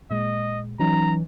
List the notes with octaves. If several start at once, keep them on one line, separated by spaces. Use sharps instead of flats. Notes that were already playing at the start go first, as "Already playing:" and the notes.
A#2 G#3 D#5
E3 F#3 C#4 D#4 A#5